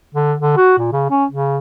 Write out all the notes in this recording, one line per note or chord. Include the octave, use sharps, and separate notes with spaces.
D3
D3
F#4
A#2
C#3
C#4
C#3